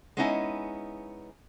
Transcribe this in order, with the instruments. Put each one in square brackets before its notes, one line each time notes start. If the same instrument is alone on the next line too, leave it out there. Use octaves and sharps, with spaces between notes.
[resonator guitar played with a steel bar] G#3 B3 C#4 D#4 E4 G#5